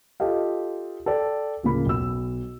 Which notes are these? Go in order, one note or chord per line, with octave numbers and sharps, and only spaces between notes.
F4 G4 A4 D#5 F5
A4 D5 G5
D1 C#3 F3 A#3 B5
B1 E6